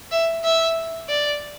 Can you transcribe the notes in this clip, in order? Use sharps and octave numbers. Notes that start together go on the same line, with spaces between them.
E5
E5
D5